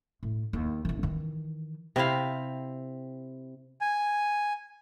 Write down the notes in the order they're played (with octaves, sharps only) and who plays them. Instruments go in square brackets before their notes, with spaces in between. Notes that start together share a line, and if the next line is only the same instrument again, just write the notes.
[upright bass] A2
D#2
A1 E3
D#3 E3
[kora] C3 C4 E4 F5
[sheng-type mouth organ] G#5